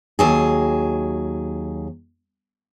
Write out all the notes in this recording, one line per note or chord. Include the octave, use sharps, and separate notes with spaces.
D#2 F#3 G#4